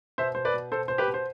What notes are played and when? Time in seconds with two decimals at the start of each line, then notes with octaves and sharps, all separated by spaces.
0.18 B2 C5 E5
0.35 B2 C5
0.45 B4 D5
0.54 B2
0.72 B2 A4 C5
0.88 B2 C5
0.98 G4 B4
1.07 B2
1.14 C5